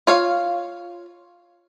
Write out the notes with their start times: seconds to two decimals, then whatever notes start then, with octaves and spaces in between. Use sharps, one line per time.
0.07 F4 C#5 F5